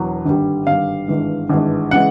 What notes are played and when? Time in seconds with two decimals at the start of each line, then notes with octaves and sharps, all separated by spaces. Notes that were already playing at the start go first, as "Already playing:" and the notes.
Already playing: E1 E2 F#3
0.25 G#1 G2 D3 G3
0.67 G#1 G2 D3 G3 F5
1.08 G#1 G2 E3 G#3
1.50 G#1 G2 E3 G#3
1.91 C#3 E3 G#3 F#5